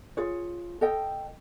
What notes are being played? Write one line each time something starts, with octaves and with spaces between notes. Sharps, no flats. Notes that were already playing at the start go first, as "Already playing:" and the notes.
F4 G#4 C#5
A4 D#5 G5